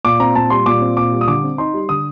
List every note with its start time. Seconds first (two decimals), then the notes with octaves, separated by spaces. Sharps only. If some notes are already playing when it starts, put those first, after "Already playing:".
0.05 A#2 D6
0.20 C4 A#5
0.35 A#2 A5
0.50 G3 C6
0.66 A#2 D6
0.81 C4
0.97 A#2 D6
1.12 G3
1.21 D#6
1.28 D3 D6
1.43 C4
1.58 D#4 C6
1.74 G3
1.89 D3 D#6